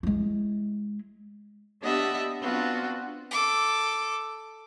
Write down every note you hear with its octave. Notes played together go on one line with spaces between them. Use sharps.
G#3 E4
B3 D4 G4 D#5 E5 F#5
B3 C4 D4 F4 F#4 B4
A4 D6